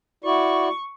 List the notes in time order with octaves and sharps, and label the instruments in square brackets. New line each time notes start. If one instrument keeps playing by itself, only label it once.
[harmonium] E4 F#4 D5 [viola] C#6